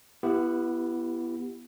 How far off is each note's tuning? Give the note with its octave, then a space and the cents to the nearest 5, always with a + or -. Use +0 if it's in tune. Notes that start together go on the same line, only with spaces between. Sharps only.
B3 -5 E4 +25 G4 +0